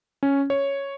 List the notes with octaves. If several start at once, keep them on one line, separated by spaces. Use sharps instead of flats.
C#4
C#5